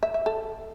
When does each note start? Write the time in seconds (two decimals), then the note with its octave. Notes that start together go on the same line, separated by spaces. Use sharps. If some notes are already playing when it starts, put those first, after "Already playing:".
0.03 E5
0.14 E5
0.26 A4